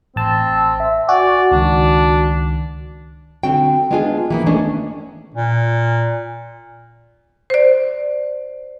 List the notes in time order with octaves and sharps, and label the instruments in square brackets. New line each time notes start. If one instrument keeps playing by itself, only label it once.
[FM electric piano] A1 A5 [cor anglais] C4
[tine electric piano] E5
[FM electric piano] F#4 [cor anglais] D5 [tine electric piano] G#5
[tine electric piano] C#2 D#3 [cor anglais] D4
[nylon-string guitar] D3 C4 F#4 G5
G#3 B3 D4 F4 G#4 G#5
E3 A#3 B3
D#3 G#3 A3 C#4 D4
[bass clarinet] A#2
[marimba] C5 D5